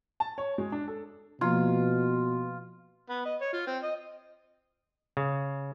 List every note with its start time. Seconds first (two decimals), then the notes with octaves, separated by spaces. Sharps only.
0.20 A5
0.38 C#5
0.58 G#3
0.72 D4
0.88 A4
1.41 B2 F3 A#3 F4
3.09 B3
3.25 D#5
3.41 C#5
3.53 F4
3.67 C4
3.83 D#5
5.17 C#3